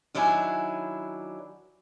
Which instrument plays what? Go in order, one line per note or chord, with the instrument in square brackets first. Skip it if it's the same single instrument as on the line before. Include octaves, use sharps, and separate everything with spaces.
[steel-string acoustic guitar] D#3 F#3 D4 E4 D#5 G#5